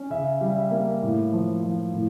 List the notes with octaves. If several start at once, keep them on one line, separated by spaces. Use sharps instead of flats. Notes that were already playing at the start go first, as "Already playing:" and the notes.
Already playing: C#4
C#3 E5
G3
E5
A#3
A2
F3
F3
A2